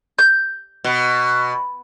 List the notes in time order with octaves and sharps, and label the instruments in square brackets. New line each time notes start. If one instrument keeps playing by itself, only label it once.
[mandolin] G6
[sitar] B2